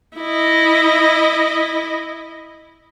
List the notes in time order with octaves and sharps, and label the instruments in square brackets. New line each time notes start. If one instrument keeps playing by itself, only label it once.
[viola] E4 D#5